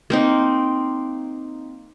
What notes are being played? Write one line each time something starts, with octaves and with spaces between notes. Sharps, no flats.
A#3 C4 D#4